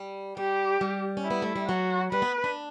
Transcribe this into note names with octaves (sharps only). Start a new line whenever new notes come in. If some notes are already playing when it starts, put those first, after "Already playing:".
Already playing: G3
G3 G4
G3
C#4
E4
B3
A3
G3
F#3 F#4
G3 B4
B3
D4